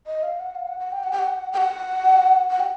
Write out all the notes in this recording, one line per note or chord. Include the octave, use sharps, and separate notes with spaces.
D#5
F5
F#5
F5
F#5
F#5
G5
F#5
G5
F#5
G5
F#5
F#5
G5